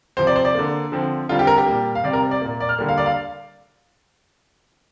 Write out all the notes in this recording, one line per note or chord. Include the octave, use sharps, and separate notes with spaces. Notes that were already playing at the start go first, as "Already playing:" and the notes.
C3 F3 C4 C5
D5
C5
D5
D3 A#3
D3 F3 C4
D3 G3 C4 F4
G4
A#4
G4
A#2 G3 A#3
F5
C3 G3 C4 D5
A#4
D5
A#2 A#3
D5
F6
D3 G3 A#3
F5
D5
F5